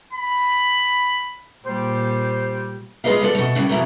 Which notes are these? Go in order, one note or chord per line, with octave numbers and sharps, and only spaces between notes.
B5
A#2 G3 G4 C5
G#3 F4 G#4 B4 D#5 F5
B3 A4 D5
B2 A3
A2 C#3 G3
F2 B2 E4 A#4